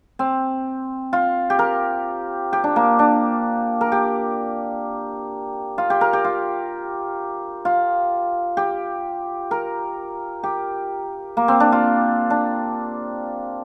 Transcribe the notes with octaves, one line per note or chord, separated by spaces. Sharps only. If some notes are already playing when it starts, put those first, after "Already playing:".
C4
F4
G4
A#4
G4
D4
A#3
D4
A#4
G4
F4
G4
A#4
G4
F4
F4
G4
A#4
G4
A#3
C4
D4
F4
D4